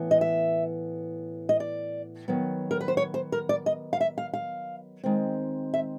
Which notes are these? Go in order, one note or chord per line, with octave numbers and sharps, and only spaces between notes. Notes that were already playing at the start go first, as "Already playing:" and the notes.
Already playing: A2 E3 B3
D#5
E5
D#5
D5
D#3 F#3 B3
A#4
B4
C5
C#5
C5
A#4
D5
D#5
F5
E5
F5
F5
D#3 G#3 C4
E5